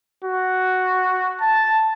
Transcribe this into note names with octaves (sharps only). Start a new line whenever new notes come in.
F#4
A5